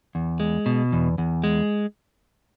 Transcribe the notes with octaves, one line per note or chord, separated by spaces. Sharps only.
E2
G#3
B2
E2
E2
G#3